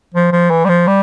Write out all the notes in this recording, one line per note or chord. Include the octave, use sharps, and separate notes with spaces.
F3
F3
E3
G3
F3
G3